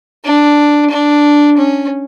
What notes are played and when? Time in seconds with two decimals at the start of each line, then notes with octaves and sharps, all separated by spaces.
0.24 D4
0.90 D4
1.57 C#4